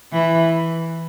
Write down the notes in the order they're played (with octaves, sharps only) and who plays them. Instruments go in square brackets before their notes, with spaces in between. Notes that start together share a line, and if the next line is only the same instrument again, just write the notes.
[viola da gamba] E3